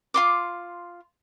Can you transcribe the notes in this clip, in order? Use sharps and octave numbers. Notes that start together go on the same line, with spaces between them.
F4 C6 D6